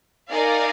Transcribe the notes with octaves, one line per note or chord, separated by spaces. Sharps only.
D#4 A#4 D5 F5 G#5